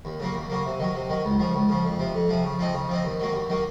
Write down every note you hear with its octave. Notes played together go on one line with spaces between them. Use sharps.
D#2
C#3 F#3 A#3
D#2
C#3 F#3 A#3
C3
D#3 F#3
C3
D#3 F#3
C#2
C#3 F3
C#2
C#3 F3
F2
C3 F3
F2
C3 F3
C#3
F3 C4 D#4
C#3
F3 C4 D#4
D#2
D#3 F#3 A#3
D#2
D#3 F#3 A#3